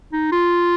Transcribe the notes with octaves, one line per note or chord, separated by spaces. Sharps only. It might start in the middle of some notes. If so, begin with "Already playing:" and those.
D#4
F4